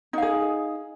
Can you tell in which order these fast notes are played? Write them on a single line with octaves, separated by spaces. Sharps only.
D#4 F5 G#4